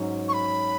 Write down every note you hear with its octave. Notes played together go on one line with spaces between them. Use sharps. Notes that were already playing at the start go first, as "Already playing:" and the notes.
Already playing: G#2 F#3 C#4
C#6
B5